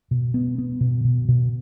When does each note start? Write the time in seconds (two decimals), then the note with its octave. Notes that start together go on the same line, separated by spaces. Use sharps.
0.11 B2
0.34 B3
0.58 B3
0.81 B2
1.05 B2
1.28 B2